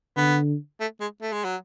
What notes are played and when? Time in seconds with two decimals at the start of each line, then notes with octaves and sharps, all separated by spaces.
0.17 D3 B3
0.80 A3
1.00 G#3
1.21 A3
1.32 G#3
1.44 F#3